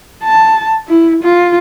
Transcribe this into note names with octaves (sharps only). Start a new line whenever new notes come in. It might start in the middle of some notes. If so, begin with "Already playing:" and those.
A5
E4
F4